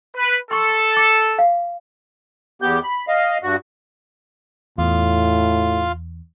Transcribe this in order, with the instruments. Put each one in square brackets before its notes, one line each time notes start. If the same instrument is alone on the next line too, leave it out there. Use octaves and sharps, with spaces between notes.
[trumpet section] B4
[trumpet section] A4 [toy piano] C6 C#6
[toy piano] D6
F5
[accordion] E2 B3 G4 G6
B5
D#5 F5
G2 F#4
[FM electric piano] E2 [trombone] A2 [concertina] F4 F5